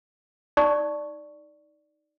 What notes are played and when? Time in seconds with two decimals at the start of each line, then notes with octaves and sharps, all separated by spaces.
0.57 D#4 D5 C#6